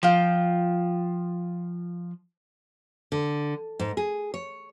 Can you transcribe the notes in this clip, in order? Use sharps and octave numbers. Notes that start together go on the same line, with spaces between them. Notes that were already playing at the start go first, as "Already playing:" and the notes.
F3 F4 G5
D3
G#2
G#4
C#5